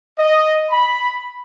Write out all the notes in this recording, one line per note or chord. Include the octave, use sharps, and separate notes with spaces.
D#5
B5